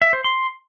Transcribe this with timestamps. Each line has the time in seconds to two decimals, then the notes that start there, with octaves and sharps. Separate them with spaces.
0.02 E5
0.13 C5
0.24 C6